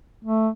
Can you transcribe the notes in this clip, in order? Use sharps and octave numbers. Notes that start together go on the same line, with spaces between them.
A3